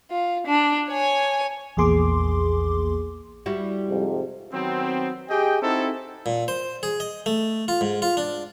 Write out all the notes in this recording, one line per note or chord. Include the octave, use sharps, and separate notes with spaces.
F4
D4
C#5 G#5
A#1 E2 A#3 G#4 C6 D6
G3 E4 F#4
F2 G#2 C3
D#3 F#3 B3 C4
G4 G#4 D#5 G5
C4 D#4 E4 F#4 A4
A#2
C5
G#4
D#5
A3
F4
G#2
F4
D4